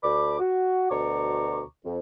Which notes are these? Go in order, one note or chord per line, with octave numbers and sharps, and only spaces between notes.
D2 D4 B5 D6
F#4
D2 B2 D5 A#5 C#6 D6
F2